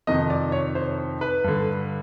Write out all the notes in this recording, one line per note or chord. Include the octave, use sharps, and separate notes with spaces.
F2 C3 D#3 D#5
D5
C#5
C5
B4
G2 D3